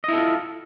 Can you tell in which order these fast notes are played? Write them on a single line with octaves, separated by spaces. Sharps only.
D#5 E4 A4 F4